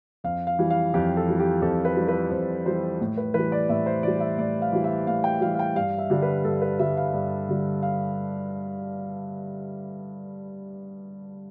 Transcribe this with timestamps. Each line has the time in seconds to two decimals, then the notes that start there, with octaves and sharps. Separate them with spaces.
0.24 F2 F5
0.47 F5
0.59 E3 G3
0.70 F5
0.94 F2 G4
1.17 A4
1.27 E3 G3
1.40 G4
1.62 F2 A4
1.85 B4
1.96 E3 G3
2.08 B4
2.31 F2 C5
2.65 E3 G3 C5
3.01 A2
3.17 B4
3.34 E3 G3 B4
3.52 D5
3.69 A2 E5
3.86 C5
4.03 E3 G3 D5
4.20 E5
4.38 A2 D5
4.62 F5
4.72 E3 G3
4.84 E5
5.07 A2 F5
5.24 G5
5.41 E3 G3 F5
5.55 F5
5.59 G5
5.75 G2 F5
5.98 E5
6.10 D3 G3
6.22 B4
6.44 G2 A4
6.62 B4
6.79 D3 G3 E5
6.97 F5
7.13 G2
7.49 D3 G3
7.83 F5